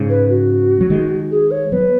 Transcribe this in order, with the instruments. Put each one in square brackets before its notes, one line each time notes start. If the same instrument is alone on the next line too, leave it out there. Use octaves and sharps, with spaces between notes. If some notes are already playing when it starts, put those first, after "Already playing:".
Already playing: [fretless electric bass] G#2 C#3
[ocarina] B4
F#4
[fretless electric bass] F#3
D#3 G#3
[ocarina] G#4
C#5
[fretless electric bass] F#3 B3 [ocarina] B4